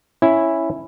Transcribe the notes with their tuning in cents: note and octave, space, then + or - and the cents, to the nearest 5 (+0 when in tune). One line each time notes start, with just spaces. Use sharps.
C#4 -10 E4 +0